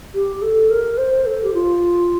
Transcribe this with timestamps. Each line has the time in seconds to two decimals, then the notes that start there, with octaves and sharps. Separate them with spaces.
0.14 G4
0.42 A4
0.70 A#4
0.98 C5
1.26 A4
1.44 G4
1.54 F4